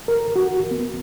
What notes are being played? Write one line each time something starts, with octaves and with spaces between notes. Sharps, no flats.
A#4
F#4
B3